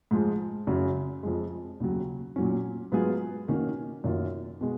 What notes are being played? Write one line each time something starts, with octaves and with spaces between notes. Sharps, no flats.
G#2 F3 G#3
F#2 C#3 F#3
F2 F3 G#3
D#2 C#3 F#3
A#2 F#3 C#4
G#2 F#3 B3 F4 G#4
D#3 A#3 C#4 F#4
F#2 D#3 A#3 F4
B2 G#3